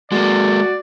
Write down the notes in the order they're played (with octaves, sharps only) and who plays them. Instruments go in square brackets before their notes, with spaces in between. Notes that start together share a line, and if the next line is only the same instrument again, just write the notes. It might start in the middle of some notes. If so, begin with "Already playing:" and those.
[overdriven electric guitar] G#3 A#3 [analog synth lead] F#4 [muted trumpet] D5